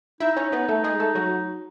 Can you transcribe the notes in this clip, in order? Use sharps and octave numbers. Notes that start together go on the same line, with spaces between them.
D#4 E4 E5
C#4 C#5
B3 B4
A3 A4
G#3 G#4
A3 A4
F#3 F#4